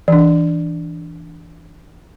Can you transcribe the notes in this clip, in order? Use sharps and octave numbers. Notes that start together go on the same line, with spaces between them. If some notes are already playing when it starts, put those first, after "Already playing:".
E3 D4